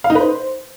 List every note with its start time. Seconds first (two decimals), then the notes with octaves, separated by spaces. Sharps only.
0.04 F5
0.10 D#4
0.15 B4
0.21 C5